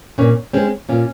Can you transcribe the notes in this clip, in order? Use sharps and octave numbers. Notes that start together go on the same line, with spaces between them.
A#2 C#4
G#3 C4 C#4
A#2 C#4